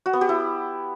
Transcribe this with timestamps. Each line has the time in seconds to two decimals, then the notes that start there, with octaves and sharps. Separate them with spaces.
0.06 F#4
0.13 B3
0.21 G4
0.29 E4